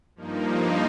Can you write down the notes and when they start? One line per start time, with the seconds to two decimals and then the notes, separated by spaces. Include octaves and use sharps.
0.16 G2 F3 A#3 D#4